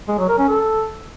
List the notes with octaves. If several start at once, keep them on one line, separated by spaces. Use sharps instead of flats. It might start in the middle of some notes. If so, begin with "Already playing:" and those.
G#3
F#3
A#4
C#4
A4